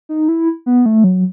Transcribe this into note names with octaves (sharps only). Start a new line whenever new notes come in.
D#4
E4
B3
A3
F#3